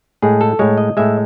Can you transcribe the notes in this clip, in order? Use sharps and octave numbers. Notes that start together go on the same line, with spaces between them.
A2 G#3 G#4
A4
A2 G#3 C#5
D#5
A2 G#3 E5